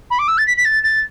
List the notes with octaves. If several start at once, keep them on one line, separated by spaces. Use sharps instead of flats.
B5
D6
E6
A6
B6
B6
A6
A6